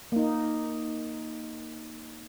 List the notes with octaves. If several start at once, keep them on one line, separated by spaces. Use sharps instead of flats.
A#3 D#4